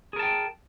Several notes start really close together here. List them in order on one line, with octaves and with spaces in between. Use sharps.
G#4 A#4 A5 G5